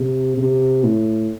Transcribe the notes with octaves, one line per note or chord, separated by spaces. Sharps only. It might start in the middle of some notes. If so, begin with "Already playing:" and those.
Already playing: C3
C3
A2